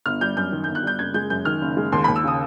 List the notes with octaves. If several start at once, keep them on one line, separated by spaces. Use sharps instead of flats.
G1 F6
G3 G6
F#2 G6
D#3
G6
G1
F#6
G3 G6
F#1 G#6
G#3 G6
F#2 G6
D#3 F6
F#1
G#3
D#2 C6
B5
D#2
E6
C#3 D#6